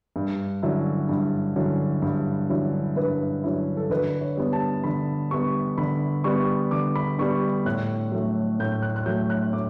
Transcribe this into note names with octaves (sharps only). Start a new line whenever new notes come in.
G2
D3 F#3 C#4 E4
G2
D3 F#3 C#4 E4
G2
D3 F#3 C#4 E4
G2 B4
D3 F#3 C#4 E4
A4
D3 B4
C#5
G3 B3
A5
D3 B5
G3 B3 C#6
D3 B5
G3 B3 C#6
D3 D6
B5
G3 B3 C#6
A2 F#6
F#3 A3
A2 G6
F#6
F#6
F#3 A3 G6
F#6
A2 D6